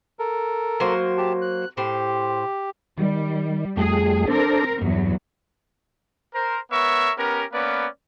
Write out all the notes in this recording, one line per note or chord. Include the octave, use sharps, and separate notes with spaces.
A4 A#4
F#3 A#3 C5
G4 A5
F#6
A2 G4 C5
D#3 G3
F2 G3 A3 G#4
C4 D4 A4 A#4 C5
E2 G2 F#3
A#4 C5
B3 A#4 C#5 E5 C#6
B3 C#4 G4 A#4
A#3 B3 C#4 B4 D5